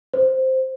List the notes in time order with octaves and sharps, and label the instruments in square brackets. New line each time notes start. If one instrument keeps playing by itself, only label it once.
[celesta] C5